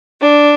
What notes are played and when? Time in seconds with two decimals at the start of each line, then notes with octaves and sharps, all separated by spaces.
0.21 D4